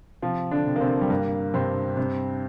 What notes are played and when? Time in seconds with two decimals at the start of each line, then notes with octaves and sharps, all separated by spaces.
0.22 C3 F3 F4
0.51 D3 D4
0.67 C3
0.76 A#3
0.81 C3 C4
1.01 G3
1.10 G2 A#3
1.54 G2 C3 C4
1.97 C3